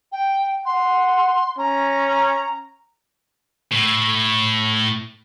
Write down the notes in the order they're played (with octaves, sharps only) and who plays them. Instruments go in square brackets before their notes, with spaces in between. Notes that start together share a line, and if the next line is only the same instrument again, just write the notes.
[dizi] G5
[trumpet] F#5 [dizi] C6
[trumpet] C#4 [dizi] A#5
[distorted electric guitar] A2